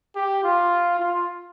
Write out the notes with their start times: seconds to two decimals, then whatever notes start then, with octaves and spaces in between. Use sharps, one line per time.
0.16 G4
0.43 F4
0.99 F4